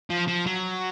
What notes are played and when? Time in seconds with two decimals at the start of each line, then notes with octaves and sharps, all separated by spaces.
0.10 F3
0.28 F3
0.47 F#3